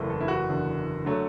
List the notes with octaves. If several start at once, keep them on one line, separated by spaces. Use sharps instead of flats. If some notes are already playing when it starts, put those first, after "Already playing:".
Already playing: F#1 E2 E3 A3
A4
E4
F#4
F#1 E2 D3
D3 F#3 A3